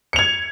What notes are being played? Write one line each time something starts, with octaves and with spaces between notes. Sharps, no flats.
G#6 C#7 F7